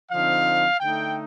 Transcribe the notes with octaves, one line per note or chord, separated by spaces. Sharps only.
D3 F3 C4 D#4 F5
D3 A3 D#4 G5